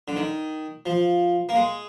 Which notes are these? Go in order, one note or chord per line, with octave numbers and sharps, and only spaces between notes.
D3
D#3
F3
A#3
G#3